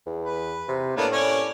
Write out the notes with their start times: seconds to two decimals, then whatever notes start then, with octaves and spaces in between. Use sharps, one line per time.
0.06 E2
0.25 B4
0.68 C3
0.97 A2 A#3 B3 D4
1.12 C#4 C#5 D5